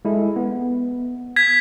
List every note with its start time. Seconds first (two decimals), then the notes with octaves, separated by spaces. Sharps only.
0.05 G#3 E4 A4
0.36 B3
1.36 G#6 B6